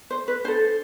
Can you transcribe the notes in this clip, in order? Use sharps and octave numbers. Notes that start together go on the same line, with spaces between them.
C5
B4
D4 A4 C5